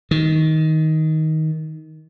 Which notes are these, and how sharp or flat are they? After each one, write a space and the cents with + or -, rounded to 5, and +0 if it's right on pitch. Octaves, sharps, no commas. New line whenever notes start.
D#3 +15